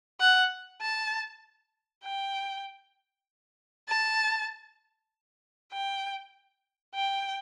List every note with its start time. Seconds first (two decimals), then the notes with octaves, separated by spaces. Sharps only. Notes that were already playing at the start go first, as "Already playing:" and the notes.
0.20 F#5
0.81 A5
2.05 G5
3.88 A5
5.73 G5
6.95 G5